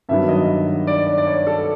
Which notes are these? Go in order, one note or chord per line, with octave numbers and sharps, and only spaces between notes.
G2 D#3 F#3 B3 E5
D#5
D5
D5
D5
C#5
A4